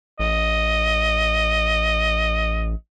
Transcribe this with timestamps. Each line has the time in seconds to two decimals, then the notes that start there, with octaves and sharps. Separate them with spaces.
0.20 A1 D#5